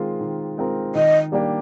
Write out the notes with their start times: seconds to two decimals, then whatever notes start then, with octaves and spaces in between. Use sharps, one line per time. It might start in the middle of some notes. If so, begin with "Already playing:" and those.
Already playing: D#3 G#3 C4 F4 A#4
0.21 D#3
0.57 G#3 C4 F4 A#4
0.95 D#3 D#5
1.32 G3 A#3 D4 G4